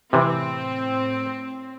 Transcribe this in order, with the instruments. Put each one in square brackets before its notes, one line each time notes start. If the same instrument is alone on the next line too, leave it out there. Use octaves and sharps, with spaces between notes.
[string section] A2 C4 [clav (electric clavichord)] C3 E3